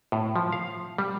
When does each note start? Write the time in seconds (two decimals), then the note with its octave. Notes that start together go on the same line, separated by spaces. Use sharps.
0.12 A2
0.36 F3
0.52 F5
0.98 G3